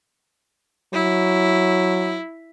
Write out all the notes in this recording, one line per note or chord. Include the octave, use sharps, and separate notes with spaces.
F#3 E4